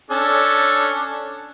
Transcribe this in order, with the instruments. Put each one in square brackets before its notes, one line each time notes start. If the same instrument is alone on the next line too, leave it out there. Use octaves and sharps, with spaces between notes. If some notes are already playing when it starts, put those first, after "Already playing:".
[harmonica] C#4 D4 A4